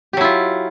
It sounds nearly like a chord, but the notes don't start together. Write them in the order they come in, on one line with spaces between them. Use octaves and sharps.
G4 F#3 E4 F4